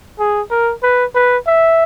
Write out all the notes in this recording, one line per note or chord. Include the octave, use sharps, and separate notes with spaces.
G#4
A#4
B4
B4
E5